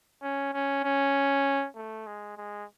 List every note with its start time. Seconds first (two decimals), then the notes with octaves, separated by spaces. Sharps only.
0.22 C#4
0.53 C#4
0.84 C#4
1.76 A3
2.07 G#3
2.37 G#3